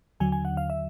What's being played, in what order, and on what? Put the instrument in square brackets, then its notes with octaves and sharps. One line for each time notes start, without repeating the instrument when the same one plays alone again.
[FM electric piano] D#2 D3 F#3 G#5
G#5
F#5
F5
E5